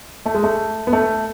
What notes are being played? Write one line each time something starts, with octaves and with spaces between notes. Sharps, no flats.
A3
G#3
A3
B3
A3